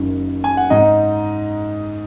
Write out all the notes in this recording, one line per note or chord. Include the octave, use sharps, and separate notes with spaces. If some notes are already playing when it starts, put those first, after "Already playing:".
Already playing: F#1 F#2 D#3
G#5
F#5
G#2 G#3 D#4 D#5